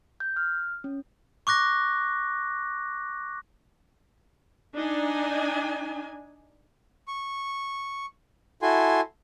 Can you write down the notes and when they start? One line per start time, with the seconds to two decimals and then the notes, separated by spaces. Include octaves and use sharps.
0.20 G6
0.36 F6
0.84 C#4
1.47 C#6 D6 F#6 A#6
4.74 D4 D#4 G#5
7.08 C#6
8.62 E4 F#4 A4 G#5 C6